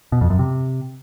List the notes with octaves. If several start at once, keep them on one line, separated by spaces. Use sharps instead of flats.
B2
F2
F#2
C3